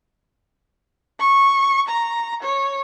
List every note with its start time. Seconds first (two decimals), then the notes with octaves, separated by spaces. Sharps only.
1.20 C#6
1.88 A#5
2.43 C#5